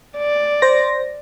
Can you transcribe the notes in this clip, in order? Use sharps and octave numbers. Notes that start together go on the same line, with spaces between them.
D5
C5 A#6